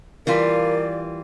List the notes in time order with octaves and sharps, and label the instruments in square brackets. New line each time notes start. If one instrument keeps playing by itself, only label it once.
[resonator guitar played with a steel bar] E3 G3 F4 [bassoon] A#3 [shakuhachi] D5